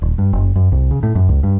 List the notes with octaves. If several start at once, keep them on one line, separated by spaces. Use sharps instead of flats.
D#1
G2
F#1
F#2
C2
C#3
A2
F#2
C#2
G2